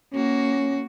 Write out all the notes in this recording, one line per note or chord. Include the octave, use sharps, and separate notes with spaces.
A#3 C#4 F#4